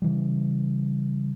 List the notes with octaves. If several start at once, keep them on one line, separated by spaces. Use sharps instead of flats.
C#3 E3 G3